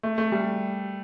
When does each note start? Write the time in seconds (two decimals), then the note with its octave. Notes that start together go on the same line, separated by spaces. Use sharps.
0.03 A3
0.18 A3
0.32 G3